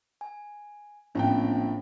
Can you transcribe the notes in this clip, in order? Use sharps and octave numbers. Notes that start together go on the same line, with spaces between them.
G#5
A#1 A2 C4 C#4 G5